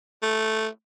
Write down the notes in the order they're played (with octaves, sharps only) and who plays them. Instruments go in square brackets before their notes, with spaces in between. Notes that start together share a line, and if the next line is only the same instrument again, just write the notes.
[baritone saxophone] A3